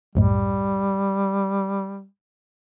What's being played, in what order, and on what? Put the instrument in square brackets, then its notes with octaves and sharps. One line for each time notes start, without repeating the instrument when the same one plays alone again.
[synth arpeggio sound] C2 F#2 A2 [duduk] G3